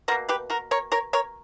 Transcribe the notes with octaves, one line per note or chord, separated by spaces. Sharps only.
B2 A#3 F#4 A#4
G4 B4
F#4 A#4
A#4 C#5
A#4 C#5
A#4 C#5